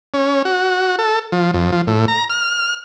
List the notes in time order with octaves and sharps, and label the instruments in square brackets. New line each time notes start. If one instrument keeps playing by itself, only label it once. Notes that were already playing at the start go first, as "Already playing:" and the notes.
[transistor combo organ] C#4
F#4
A4
F3
F2
F3
A2
A#5
F6